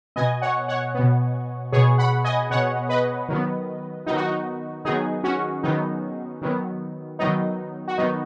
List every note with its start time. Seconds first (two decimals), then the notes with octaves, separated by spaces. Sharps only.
0.16 B2 B3 D#5 G#5
0.42 C#5 F#5
0.68 C#5 F#5
0.95 B2 B3
1.72 B2 B3 G#4 C#5
1.98 F#5 B5
2.24 D#5 G#5
2.50 B2 B3 C#5 F#5
2.89 B4 D#5
3.29 D#3 F#3 B3
4.06 D#3 F#3 B3 D#4
4.16 F#4
4.26 D#4
4.85 D#3 F#3 B3 D#4 G#4
5.24 C#4 F#4
5.63 D#3 F#3 B3 D#4
6.42 D#3 F#3 B3
7.19 D#3 F#3 B3 D#4
7.88 F#4
7.98 D#3 F#3 B3 D#4